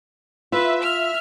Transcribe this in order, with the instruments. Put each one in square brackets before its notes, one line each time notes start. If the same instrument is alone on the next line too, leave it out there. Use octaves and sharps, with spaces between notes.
[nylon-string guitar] F4 [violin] B4 [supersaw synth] E5
[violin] F6